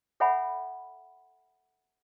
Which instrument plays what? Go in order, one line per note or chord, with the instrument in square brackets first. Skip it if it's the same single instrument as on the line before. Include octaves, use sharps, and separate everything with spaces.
[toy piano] A4 C#5 E5 F#5 G#5 B5